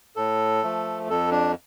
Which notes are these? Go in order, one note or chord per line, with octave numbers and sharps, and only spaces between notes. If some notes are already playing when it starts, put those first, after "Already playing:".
A2 A4
F3 A3
F2 A4
D4